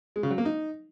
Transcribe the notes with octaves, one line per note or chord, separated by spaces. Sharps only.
G#3
C#3
F#3
A#3
D#4